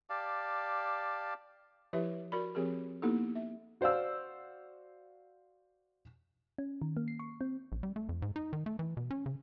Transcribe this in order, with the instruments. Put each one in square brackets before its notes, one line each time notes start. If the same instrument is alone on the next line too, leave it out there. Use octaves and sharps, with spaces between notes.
[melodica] G4 D5 F5 A5
[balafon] F3 E4 G4 B4 E5
F#4 A#4 D5 B5
F3 C4 G4 G#4 A#4
A#3 B3 D#4 E4 G4 A4
E5
[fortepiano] F#4 C5 D5 F5 E6
[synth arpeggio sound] C#4
D#3
A#3
C7
C#6
C4
[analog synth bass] A#1
G3
A3
F2
G#2
D#4
D#3
A3
E3
B2
C#4
C#3